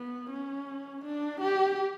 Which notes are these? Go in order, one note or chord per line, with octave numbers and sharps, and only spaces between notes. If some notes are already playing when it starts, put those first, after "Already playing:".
Already playing: B3
C#4
D4
G4